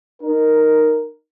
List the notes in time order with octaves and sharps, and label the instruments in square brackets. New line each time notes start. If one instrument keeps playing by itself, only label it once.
[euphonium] D#4 [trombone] A#4